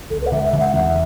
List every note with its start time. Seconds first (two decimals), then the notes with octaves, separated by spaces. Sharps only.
0.10 C#2 A4
0.21 B4
0.26 F#5
0.32 C#2 E5
0.45 E5
0.53 C#2
0.60 F#5
0.74 E2 E5